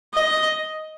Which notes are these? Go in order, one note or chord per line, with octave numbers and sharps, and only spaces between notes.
D#5